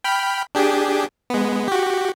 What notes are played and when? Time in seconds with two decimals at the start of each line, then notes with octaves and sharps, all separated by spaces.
0.04 G5 B5 F6
0.55 D4 G4 G#4
1.30 G#3 B3
1.68 F#4 G4